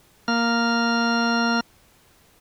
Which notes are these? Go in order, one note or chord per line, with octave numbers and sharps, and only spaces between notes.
A#3 F6